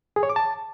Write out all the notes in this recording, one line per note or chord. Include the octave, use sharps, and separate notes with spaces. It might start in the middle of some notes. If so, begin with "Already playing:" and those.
G#4
C#5
D6
A5